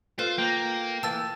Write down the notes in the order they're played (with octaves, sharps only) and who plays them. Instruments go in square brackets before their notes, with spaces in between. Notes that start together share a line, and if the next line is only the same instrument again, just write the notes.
[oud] F4 [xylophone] A4 B4 F5 [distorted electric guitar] C5
[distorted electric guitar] A#3 [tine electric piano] G5
[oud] E3 A#3 [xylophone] A5 E6 A6